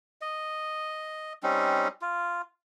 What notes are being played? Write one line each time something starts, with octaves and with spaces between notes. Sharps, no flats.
D#5
G3 C4 C#4 D#4
F4